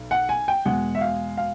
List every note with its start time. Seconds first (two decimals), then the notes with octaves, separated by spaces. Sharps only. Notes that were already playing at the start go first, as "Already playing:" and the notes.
Already playing: B1
0.11 F#5
0.29 G#5
0.48 G5
0.65 E2 B2 G#3 F#5
0.95 E5
1.01 F5
1.37 F5